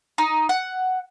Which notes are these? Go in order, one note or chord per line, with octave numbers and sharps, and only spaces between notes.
D#4
F#5